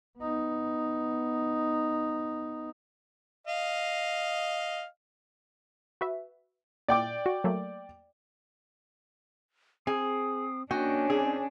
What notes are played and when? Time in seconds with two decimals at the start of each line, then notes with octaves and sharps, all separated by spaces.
0.19 B3 D#4
3.47 D#5 F5
6.01 F#4 B4 E5
6.88 A#2 D5 G5 D6
7.26 F#4
7.44 F#3 A3 A#3
9.87 C4 G#4 D#6
10.71 A#3 C#4 D4 F#4 D#5 G5 G#5
11.10 C4 D#4 G#4